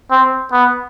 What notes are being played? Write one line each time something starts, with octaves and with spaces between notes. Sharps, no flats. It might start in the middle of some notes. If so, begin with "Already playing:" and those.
C4
B3